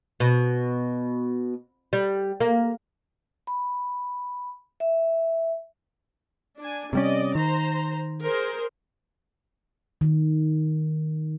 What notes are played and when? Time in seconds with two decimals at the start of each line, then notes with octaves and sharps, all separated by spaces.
0.20 B2
1.93 G3
2.40 A#3
3.47 B5
4.80 E5
6.59 D4 G#5
6.93 C3 G3 C#4 D5 D#5
7.35 D#3 C5 A#5
8.21 G#4 A#4 C5
10.01 D#3